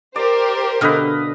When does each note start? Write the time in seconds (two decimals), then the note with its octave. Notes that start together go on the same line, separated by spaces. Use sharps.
0.16 G4 A#4 C5 D5
0.81 B2 D3 B4 D#5 F5